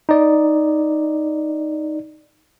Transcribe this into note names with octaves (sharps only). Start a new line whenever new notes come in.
D#4 D5